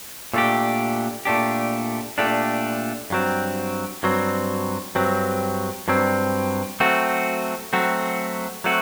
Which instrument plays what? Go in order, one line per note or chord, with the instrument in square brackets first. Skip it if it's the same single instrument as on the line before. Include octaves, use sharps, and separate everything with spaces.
[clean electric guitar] A#2 A3 D4 G4
A#2 A3 D4 G4
A#2 A3 D4 G4
G2 F#3 C4
G2 F#3 C4
G2 F#3 C4
G2 F#3 C4
F#3 A3 C4 F#4
F#3 A3 C4 F#4
F#3 A3 C4 F#4